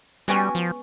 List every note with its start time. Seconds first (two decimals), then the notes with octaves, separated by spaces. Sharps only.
0.28 G3 G#3 B3 C#4 F#4 G5 G#5
0.55 F3